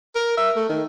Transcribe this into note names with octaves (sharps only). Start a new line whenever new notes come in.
A#4
E5
A3
D#3